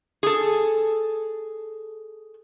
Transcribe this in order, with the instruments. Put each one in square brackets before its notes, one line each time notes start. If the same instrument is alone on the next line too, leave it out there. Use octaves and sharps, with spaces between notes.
[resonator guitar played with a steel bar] G#4 A4